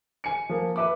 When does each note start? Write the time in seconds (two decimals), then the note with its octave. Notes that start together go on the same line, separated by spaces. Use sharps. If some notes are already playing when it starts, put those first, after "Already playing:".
0.24 G#5 C#7
0.49 F3 A#3
0.76 B4 E5 D6